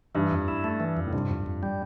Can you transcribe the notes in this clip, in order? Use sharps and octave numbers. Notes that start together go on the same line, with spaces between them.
G2 E3
F2
E4
A3
E3
F2
A2
G2 C3
F2
F2
G3